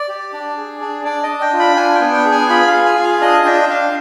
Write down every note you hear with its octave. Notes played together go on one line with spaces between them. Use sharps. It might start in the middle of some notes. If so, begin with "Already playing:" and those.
Already playing: D5
G4
D4
G#4
D4
D4 D5
D#5
D4
G5
F4
B5
D4 G#5
G5
B3
G5
G#4
G#5
F4 B5
F5
G#4
G#5
F4
F5
D4 D#5
D4 G5
D4 F5